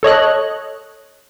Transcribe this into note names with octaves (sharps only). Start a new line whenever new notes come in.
A4 C#5 D#5 F#6